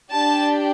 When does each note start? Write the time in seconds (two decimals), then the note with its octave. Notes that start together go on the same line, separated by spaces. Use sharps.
0.12 D4 G4 A5